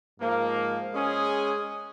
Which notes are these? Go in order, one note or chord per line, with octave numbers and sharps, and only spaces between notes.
G#2 F3 A#3
G#3 C#4 G#4